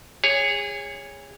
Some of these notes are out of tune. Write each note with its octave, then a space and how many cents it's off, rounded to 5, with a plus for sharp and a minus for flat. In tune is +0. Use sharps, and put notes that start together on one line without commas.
G#4 -25 C#5 +0